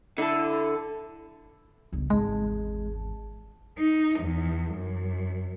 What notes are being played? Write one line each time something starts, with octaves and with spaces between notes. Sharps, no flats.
D3 E4 A4
G1 C#2
G#1 E2 G#3 G#4 A5
D#4
E2
F#2